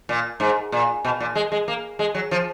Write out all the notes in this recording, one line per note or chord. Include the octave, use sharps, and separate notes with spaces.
A#2
G#2
A#2
B2
A#2
G#3
G#3
A#3
G#3
F#3
F3